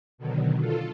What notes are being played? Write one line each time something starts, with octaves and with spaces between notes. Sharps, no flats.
B2 D3 D#3 F#3
F4 A4